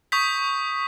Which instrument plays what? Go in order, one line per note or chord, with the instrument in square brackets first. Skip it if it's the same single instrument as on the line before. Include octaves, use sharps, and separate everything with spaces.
[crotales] C#6 D#6 G6 B6